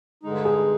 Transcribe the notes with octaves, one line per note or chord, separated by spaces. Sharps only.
G2 D3 G#3 D#4
G#4